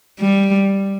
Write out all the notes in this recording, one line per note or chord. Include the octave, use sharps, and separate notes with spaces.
G3